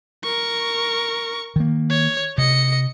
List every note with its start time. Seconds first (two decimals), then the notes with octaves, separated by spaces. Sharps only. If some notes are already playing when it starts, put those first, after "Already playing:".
0.24 A#4 C#6
1.56 D#3 A#3
1.90 C#5
2.38 C3 D#5 C#7